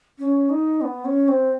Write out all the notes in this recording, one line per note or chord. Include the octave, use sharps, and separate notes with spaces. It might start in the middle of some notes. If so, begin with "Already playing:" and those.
C#4
D#4
B3
C#4
C4